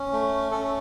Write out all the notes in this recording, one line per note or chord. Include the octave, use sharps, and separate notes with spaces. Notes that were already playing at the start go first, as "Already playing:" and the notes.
Already playing: C#4
A3
C#4 A4